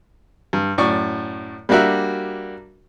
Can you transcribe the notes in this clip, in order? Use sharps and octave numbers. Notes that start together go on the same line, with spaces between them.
G2
F#2 A2 D5 C#6
G3 A#3 D4 F#4 A#4 E5